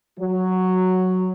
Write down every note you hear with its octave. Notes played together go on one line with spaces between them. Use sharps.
F#3